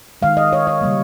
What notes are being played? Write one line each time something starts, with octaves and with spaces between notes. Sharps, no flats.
D#3 G#3 F5
D#5
C#5
C#5
C#3 G3 A#3